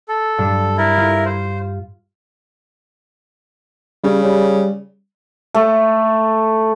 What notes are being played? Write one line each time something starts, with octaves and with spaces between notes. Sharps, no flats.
A4
G2
E4 A#4
F4
C5
C#3 G3 C#4
G3
A3